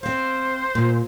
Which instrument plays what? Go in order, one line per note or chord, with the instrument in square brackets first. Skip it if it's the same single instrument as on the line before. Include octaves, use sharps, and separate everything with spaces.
[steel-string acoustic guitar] C4 F5 [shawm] C5
[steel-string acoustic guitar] A#2